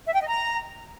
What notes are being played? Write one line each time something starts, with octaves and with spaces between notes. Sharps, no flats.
E5
G5
D#5
A#5